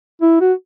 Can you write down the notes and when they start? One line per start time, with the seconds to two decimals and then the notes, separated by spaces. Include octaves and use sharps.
0.22 E4
0.41 F#4